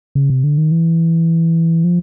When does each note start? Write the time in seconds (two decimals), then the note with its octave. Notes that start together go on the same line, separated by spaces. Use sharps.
0.15 C#3
0.30 C3
0.44 D3
0.58 D#3
0.72 E3
1.84 F3